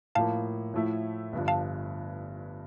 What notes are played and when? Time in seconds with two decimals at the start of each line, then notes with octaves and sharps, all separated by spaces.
0.15 A2 F3 A#3 F5 A5
0.74 A2 F3 A3 E4
1.33 G1 G2 F3
1.48 F5 A5